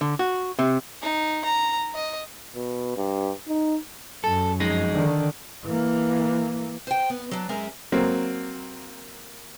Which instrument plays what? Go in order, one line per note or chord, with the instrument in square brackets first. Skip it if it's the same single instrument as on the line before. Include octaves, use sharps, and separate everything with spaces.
[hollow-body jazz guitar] D3
F#4
C3
[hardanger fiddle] D#4
A#5
D#5
[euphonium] B2
G2
D#4
[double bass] F#2 [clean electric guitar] A4
[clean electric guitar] F2 G#3 D#4
[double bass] D3 D#3
E3 A#3
[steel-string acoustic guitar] C5 F#5 G5
B3
F#3 D4
F#2 G#3 A#4 E5 A#5
[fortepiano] F#3 A#3 C4